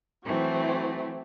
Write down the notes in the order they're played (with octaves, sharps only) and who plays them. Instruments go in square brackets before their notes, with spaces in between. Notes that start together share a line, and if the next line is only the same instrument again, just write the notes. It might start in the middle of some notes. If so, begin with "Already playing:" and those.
[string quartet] E3 F#3 A3 C4